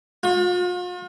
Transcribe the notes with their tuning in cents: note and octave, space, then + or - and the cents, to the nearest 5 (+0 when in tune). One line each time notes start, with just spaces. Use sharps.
F4 +45